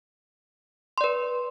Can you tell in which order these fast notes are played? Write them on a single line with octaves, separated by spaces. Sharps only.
C6 D5 B4